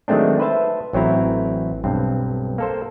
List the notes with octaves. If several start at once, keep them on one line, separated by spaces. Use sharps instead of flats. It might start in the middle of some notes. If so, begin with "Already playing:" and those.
D#3 F#3 G#3 A3 C4 D4
B4 C5 E5 A5
A1 F#3 C4 E4 A#5
B1 G2 C4
A#3 A4 C5